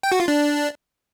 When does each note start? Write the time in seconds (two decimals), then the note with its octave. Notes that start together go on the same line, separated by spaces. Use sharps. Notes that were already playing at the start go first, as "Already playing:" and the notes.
0.03 G5
0.12 F#4
0.20 F4
0.28 D4